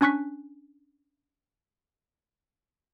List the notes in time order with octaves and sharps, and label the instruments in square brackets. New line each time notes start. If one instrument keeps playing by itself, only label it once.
[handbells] C#4 D4 G#5 C#6 F#6 B6